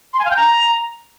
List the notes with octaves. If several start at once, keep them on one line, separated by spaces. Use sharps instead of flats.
C6
G#5
F5
G5
A#5